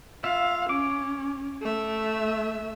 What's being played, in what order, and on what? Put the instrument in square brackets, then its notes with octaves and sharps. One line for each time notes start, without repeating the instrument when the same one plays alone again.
[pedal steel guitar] F4 E5 [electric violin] F5
[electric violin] C#4 [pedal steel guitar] D6
[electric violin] A3 E5